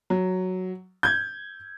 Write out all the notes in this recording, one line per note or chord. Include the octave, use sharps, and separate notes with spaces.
F#3
G6 G#6